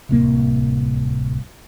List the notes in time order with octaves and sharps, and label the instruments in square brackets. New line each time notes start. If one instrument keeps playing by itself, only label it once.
[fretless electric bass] D1 C2 A#3